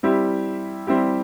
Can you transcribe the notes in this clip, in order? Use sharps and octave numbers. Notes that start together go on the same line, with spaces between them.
G3 C4 E4 G4
G3 C4 E4 G4